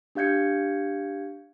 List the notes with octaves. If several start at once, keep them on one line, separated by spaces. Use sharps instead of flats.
D4 G4 F5 G6 G#6 C#7